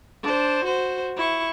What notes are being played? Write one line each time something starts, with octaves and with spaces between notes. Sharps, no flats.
D4 C5
F#4 C5
E4 C#6